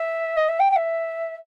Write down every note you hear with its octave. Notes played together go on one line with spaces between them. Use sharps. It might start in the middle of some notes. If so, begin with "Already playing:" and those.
Already playing: E5
D#5
E5
G5
G5
E5